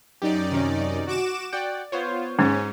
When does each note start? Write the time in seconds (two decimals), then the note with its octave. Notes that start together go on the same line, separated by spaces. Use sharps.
0.22 F#2 D#4 G4 D5
0.52 C3 D#3 C#4
1.07 F#4 D6 E7
1.53 F#4 D5 F#5 G5
1.92 B3 F4 C5 C#5
2.39 G#2 C#4